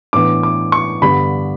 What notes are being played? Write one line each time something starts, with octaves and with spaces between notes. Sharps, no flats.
A2 E3 B3 D4 D6
D6
C#6
G2 D3 G3 B3 B5